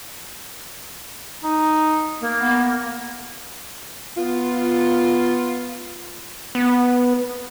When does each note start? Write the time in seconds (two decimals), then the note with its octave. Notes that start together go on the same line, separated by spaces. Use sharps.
1.44 D#4
2.21 A#3
2.41 B3
4.17 B3 F4
6.55 B3